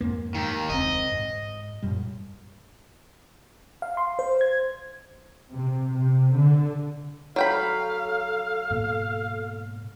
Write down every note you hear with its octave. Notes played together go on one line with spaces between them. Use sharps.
F2 G#2 A#3
D#2 D#3
E1 C#2 C4 D#5
G#2
F#2 A#2 G3
F5
C6
C5
G#6
C3
C3
D3
F#3 A4 F5 G5 B5
G#2 B2 A#3